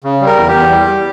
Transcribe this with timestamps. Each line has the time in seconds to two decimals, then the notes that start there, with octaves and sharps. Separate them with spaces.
0.04 C#3
0.21 G3
0.26 A#4
0.37 E2
0.48 G4
0.54 E2
0.71 G3
0.87 G3